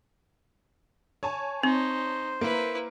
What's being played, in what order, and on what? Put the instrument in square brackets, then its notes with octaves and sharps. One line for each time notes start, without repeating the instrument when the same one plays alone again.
[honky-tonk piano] C#5 G#5 A5
[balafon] C4 [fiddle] D#4 [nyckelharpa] C5
[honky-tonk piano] A#3 [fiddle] E4 B4